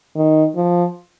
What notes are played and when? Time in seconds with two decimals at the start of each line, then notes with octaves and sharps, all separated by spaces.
0.15 D#3
0.56 F3